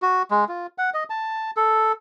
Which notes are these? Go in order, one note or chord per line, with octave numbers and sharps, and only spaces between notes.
F#4
G#3
F4
F#5
D#5
A5
A4